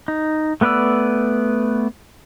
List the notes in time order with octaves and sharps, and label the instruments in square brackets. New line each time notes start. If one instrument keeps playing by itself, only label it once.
[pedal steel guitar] D#4
A3 B3 B4 D5 E6